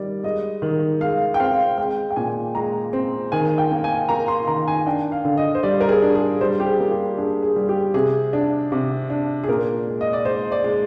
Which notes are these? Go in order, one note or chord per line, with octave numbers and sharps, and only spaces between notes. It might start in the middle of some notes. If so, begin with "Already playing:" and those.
Already playing: D#3 G3 D5
G#3 D#5
D#3
G#3 F5
G5
C4 F5
G#3 G5
G5
A#2 G#5
G#3 A#5
C4
D#3 G#5
G5
A#3
G#5
A#3 A#5
C6
D#3 A#5
G#5
D4 G5
F5
D3
D#5
C5
G3 D5
A#4
G#4
D4
G#4
G3 C5
G4
G#4
A#3
G4
D4 G#4
G#4
G3
G4
C3 G#4
D4
C3
D4
G#4
A#2 A#4
G#3
D#5
D5
G#3 C5
D5
G#3